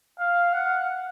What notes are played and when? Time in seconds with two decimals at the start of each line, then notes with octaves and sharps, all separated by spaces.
0.19 F5
0.53 F#5